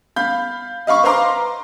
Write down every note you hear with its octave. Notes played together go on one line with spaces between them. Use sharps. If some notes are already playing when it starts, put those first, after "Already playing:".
F5 B5 G6
D#5 F5 B5 C#6
B4 C5 F5 A#5 C6 D6